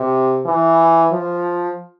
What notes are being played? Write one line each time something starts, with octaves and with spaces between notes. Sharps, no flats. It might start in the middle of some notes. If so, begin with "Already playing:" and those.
Already playing: C3
E3
F3